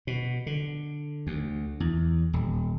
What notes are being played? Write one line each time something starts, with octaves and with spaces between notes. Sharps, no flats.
B2
D3
D2
E2
D#1